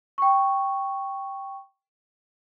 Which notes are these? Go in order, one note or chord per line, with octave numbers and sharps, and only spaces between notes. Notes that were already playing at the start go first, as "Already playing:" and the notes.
G5 C#6